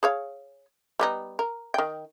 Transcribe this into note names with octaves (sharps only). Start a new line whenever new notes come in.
G#4 C#5 F5
G3 B3 D#4
A#4
D#3 G5